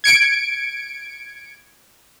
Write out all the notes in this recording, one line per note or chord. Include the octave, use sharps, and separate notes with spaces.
G#6 C#7 D7